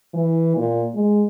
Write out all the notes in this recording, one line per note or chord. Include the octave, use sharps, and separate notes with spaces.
E3
A#2
G#3